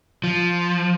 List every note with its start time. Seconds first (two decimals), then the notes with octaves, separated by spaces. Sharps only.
0.24 F3